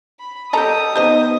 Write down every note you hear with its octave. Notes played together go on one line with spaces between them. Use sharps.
B5
G3 G4 A4 D#5 A5 A#5 D#6
B3 D#4 G4 C5 D#5 E5 G6